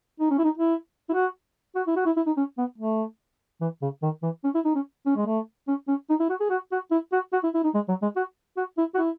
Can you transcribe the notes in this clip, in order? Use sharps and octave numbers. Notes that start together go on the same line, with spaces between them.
D#4
C#4
E4
D#4
E4
E4
F#4
F#4
E4
F#4
E4
E4
D#4
C#4
B3
A3
E3
C#3
D#3
E3
C#4
E4
D#4
C#4
C#4
G#3
A3
C#4
C#4
D#4
E4
F#4
G#4
F#4
F#4
E4
F#4
F#4
E4
E4
D#4
G#3
F#3
G#3
F#4
F#4
E4
F#4
E4